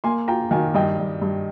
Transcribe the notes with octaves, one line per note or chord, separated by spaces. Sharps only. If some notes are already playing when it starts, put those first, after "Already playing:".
A#3 G#5 C6
F4 G5 A#5
D#3 F5 G#5
G2 D#5 G5
G2
G2